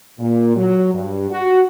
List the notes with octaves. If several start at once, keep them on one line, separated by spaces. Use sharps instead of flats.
A#2
F#3
G2
F#4